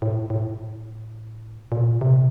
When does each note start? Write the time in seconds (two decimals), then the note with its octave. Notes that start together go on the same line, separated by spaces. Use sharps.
0.02 A2
0.30 A2
1.72 A#2
2.01 C3